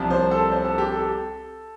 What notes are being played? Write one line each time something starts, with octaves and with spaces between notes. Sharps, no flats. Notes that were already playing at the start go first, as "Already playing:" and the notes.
Already playing: C2 C3 F3
C5
A4
C5
A4
G4
A4